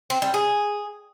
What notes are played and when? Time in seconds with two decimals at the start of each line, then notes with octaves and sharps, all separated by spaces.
0.10 C4
0.22 G3
0.34 G#4